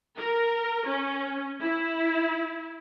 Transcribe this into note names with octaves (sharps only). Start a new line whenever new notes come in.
A#4
C#4
E4